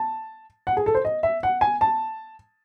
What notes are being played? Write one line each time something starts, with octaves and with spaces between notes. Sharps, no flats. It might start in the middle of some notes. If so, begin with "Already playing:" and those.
Already playing: A5
F#5
G#4
A4
C5
D#5
E5
F#5
G#5
A5